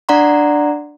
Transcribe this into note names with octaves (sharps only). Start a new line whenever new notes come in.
D4 D5 F#5 A#5 C6